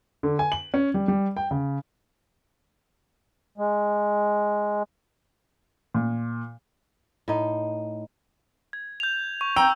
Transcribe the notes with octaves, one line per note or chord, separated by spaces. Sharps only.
D3
G#5
F#7
C#4
G3
G3
G5
C#3
G#3
A#2
A2 D#4
G#6
G6 F7
C#6
G5 A#5 E6